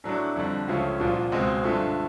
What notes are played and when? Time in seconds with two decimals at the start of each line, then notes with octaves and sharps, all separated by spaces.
0.04 A2 F#3 A3 D4
0.36 F2 D3 G3
0.68 C#2 C#3 F3 A3 C#4
0.99 C2 A#2 F3
1.32 C#2 B2 G#3 C4
1.64 G2 D3 F3 A3